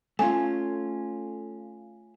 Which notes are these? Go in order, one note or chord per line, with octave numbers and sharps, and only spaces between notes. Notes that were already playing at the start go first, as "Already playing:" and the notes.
A3 C#4 F4 G#5